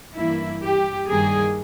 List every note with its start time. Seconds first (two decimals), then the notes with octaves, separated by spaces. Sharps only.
0.15 G2 E3 A#3 E4
0.62 G4
1.08 G2 D#3 G3 A#3 G#4